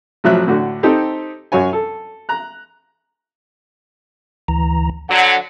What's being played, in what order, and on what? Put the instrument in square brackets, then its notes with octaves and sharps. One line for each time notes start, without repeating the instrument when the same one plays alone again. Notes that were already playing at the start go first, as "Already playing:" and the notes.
[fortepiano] A1 F3 F#3 E5 F#6
A2 D3 F#4
C4 D#4 G4 A4
F#2 F#4 C#5 G#5
A4
A#5 F#6
[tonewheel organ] D2 E3 A#5
[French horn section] D3 F#3 [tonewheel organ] F#5